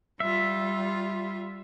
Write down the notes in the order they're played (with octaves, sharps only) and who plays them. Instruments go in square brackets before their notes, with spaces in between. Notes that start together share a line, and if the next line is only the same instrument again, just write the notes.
[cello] G3 F4 [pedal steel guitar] E5